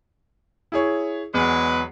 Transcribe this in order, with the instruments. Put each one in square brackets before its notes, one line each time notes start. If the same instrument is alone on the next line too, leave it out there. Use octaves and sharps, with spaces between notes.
[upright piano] E4 G#4 C#5
[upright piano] E2 [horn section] F#3 G#3 B4